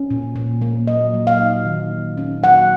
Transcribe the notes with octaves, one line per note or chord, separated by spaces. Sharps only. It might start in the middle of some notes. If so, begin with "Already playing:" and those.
Already playing: C#4
A#2
A#2
A#3
F#3 D#5
F#3
F5
D#4
D#3
D#3
C#4
F#3 F#5